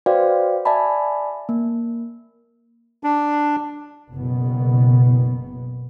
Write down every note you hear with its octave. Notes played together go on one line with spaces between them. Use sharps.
F#4 B4 C5 D5 F5 G5
D5 E5 G#5 A5 B5
A#3
D4
F#1 B2 B3